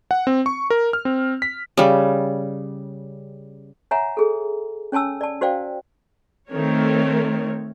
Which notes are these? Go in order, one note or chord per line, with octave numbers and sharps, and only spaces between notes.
F#5
C4
C#6
A#4
F6
C4
B6
C#3 G3
C#5 E5 F#5 G#5 A#5
G#4 A4
C#4 C#5 G#5 A5 E6
D5 A5
F#4 C5 D5 F5 G5
D#3 A3 C4 A#4 C#5